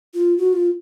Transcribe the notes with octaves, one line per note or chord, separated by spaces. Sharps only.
F4
F#4
F4